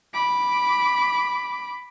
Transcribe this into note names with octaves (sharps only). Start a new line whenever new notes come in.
B5 D6